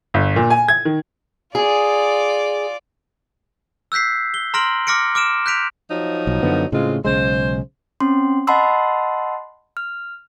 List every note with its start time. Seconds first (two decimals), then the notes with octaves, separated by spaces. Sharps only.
0.14 G1
0.36 A#2
0.50 G#5
0.68 G#6
0.85 D#3
1.55 F4 G#4 D5
3.92 E6 F#6 G6 B6 C7
4.34 G7
4.54 A#5 C6 F6 A#6 D7 F#7
4.87 D6 F6 A#6 C#7 D7
5.15 D6 F6 D7 E7
5.46 F#6 G6 B6 D7 F7
5.90 F3 F#3 D#4
6.27 B1
6.43 F#2 D3 B3
6.72 A2 C#3 G#3 C4 F4
7.05 B1 C#3 G#3 C5
8.00 C4 C#4 C6
8.47 D#5 F#5 A5 B5 C6 E6
9.77 F6